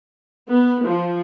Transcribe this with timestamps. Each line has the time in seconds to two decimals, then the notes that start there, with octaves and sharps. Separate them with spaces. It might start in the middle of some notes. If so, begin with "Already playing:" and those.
0.50 B3
0.87 F3